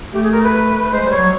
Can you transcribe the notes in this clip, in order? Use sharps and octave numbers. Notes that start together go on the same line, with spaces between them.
A3 G4
G#4
A#4
B4
G#3 C5
G3
C#5
F#3